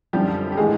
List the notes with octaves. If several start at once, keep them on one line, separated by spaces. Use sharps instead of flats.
F#2 D3 F3 G3 G4
G4
A2 E3 G#3 G#4